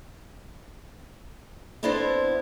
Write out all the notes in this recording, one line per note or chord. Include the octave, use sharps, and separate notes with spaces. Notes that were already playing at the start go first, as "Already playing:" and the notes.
B3 C4 D4 E4 A4 C5